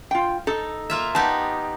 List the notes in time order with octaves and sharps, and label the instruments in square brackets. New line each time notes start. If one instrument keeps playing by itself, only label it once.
[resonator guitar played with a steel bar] F4 G5
[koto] D#4 [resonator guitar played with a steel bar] A4
[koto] A#3 F4 E5
[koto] B3 D#4 G4 [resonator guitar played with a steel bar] A5